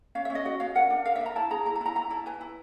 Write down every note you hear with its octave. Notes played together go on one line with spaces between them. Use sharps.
C#4 F5
E5
C#4
D#5
F#4 D#5
C#4 F5
A#4 F#5
D4
A#4 F5
E5
D4
A#5
E4 A5
G#4 A#5
E4 A#5
A5
E4 A#5
E4 A#5
E4 A5
B4 G#5
E4